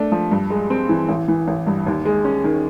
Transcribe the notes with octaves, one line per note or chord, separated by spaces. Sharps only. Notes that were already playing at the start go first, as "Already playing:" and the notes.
Already playing: A3 D4
F3
G2
G#3
C4
E3
A1
E3
A1
G2
D#2
G#3
C#4
D#3